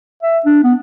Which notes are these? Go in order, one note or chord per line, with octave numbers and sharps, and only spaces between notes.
E5
D4
B3